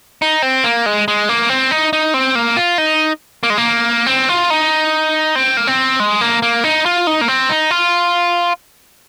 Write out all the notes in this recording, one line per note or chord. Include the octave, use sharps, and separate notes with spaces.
D#4
C4
A#3
G#3
G#3
A#3
C4
D#4
D#4
C4
A#3
F4
D#4
A#3
G#3
A#3
C4
F4
D#4
C4
A#3
C4
G#3
A#3
A#3
D#4
F4
D#4
A#3
C4
D#4
F4